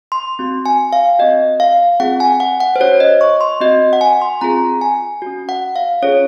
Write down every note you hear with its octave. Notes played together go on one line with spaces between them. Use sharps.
C6
C4 F#4
G#5
F5
C4 F#4 D#5
F5
C4 F4 G#4 F#5
G#5
F#5
F#5
C5
C#4 F#4 C#5
D#5
C#6
C6
C4 F#4 D#5
F#5
G#5
C6
C4 F4 G#4 A#5
G#5
C#4 F#4
F#5
F5
C#4 F4 G#4 C#5